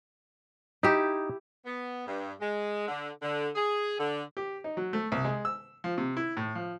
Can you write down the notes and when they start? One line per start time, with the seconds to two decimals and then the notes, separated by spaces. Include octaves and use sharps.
0.83 D#4 E4 G4
1.65 B3
2.07 G2
2.40 G#3
2.88 D3
3.22 D3
3.56 G#4
3.99 D3
4.37 G4
4.64 D#4
4.77 F#3
4.93 A3
5.12 C2
5.25 G#3
5.45 E6
5.84 F3
5.98 C3
6.17 E4
6.37 A2
6.55 F3